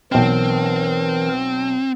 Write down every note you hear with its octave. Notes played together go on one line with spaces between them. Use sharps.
B1 E3 C4 A#4 G5